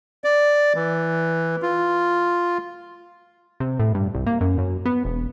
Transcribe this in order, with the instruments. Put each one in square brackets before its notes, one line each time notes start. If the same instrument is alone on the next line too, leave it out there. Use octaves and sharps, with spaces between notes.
[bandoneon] D5
E3
F4
[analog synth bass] C3
A2
G2
C2
A#3
F#2
F#2
B3
E1